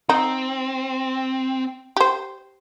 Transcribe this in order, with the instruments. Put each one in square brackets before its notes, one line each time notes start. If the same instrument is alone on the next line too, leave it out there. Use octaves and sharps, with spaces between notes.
[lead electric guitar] C4 [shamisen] D#4
[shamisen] G4 C5